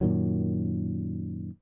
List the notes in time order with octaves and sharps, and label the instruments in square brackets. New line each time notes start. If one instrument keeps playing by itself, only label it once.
[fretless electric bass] F#2 A#2 D#3 F#3